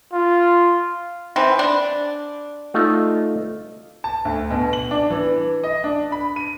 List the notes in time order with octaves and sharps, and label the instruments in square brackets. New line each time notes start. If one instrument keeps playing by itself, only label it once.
[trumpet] F4
[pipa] E3 C4
D4
[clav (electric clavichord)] A3 D#4 F4
[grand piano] A5
D2
B2
F#7
D4
E3
D#5
D4
B5
D#7